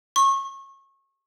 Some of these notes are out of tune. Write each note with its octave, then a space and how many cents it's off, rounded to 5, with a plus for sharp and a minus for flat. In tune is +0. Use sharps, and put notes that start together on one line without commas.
C#6 -30